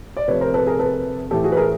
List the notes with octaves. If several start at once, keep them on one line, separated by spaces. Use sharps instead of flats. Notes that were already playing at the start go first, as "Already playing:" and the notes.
D5
C3 F3 A3 B4 C#5
A#4 C5
A4 B4
G#4 A#4
A4 B4
A2 E3 A3 G4 A4
F#4 G#4
B4
G#4 A#4